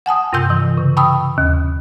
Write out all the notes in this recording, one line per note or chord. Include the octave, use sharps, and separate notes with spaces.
F#5 G#5 A5 D#6
G2 C3 E6 G6
E3
C#3
G5 A5 B5 C#6 D#6 E6
D#2